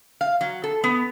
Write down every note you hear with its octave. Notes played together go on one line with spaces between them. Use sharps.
F5
F#3
A4
B3